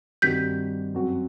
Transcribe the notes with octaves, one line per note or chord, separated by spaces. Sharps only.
G2 D#3 G3 C4 F#4 G6 B6
F#2 F#3 C4 F#4